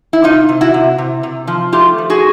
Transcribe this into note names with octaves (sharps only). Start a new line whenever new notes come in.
E4
C3 D#4 F4
C3
E4 F#4
C3
C3
C3
F3
A3 F4 G4
F3
F#4 G#4